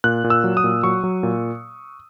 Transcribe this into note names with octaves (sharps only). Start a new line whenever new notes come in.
A#2 F#6
A#2
E6
F#3
D#6
A#2
F#3 C#6
F#3
A#2